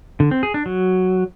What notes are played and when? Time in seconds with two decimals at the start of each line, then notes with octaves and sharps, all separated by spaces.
0.20 D3
0.31 C4
0.43 G#4
0.54 D4
0.66 F#3